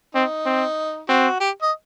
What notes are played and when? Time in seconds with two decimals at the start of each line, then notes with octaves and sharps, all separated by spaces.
0.15 C4 D#4
0.46 C4
1.09 C4 F#4
1.40 G4
1.62 D#5